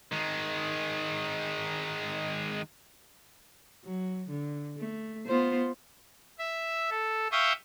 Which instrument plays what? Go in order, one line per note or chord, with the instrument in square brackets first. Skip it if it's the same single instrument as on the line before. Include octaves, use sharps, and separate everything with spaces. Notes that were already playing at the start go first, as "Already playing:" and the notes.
[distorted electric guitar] D#3 G#3
[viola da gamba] F#3
D3
A3
B3 F4 C5
[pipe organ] E5
A4
E5 F5 G5 C#6 D#6